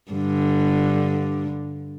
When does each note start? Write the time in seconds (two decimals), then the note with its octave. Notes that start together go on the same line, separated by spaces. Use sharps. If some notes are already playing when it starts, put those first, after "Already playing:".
0.12 G2 D3